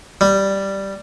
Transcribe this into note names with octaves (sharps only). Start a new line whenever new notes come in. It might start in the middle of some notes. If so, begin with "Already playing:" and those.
G3